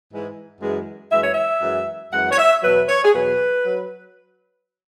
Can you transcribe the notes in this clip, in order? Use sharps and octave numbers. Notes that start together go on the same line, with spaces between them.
G#2 E3 G#3
F#2 E3 G#3
F#2 E3 G#3 E5
C#5
E5
F#2 E3 G#3
F#2 E3 G#3 F#5
C#5
E5
E2 B2 F#3 B4
C#5
G#4
E2 B2 F#3 B4
F#3